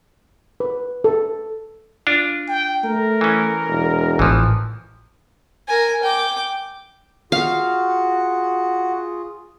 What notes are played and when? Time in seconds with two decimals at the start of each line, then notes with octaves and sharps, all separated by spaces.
0.60 B4
1.04 A4
2.07 D4 F4
2.48 G5
2.83 A3 A#4
3.21 E3 C#4
3.67 E1
4.19 A1 E3 F3
5.68 A#4 G#5
6.03 G5 D6
7.32 F4 F#4 G#4 F5